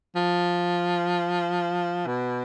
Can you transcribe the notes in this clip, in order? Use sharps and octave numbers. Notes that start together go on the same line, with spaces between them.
F3
B2